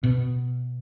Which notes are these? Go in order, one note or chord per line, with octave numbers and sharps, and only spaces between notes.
B2